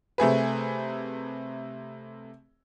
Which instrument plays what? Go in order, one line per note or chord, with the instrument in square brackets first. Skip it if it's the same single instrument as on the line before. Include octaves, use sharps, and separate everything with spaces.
[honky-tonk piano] C3 A3 G#4 B4